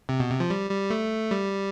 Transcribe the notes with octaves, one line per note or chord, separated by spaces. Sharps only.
C3
B2
C3
F3
G3
G3
A3
G3